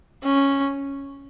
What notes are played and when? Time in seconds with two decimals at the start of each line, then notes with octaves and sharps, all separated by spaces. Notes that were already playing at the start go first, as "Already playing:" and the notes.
0.24 C#4